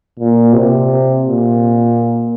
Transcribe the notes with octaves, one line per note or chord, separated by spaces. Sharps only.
A#2
C3
A#2